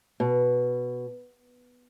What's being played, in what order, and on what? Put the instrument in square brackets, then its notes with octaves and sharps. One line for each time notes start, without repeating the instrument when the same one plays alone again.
[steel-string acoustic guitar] B2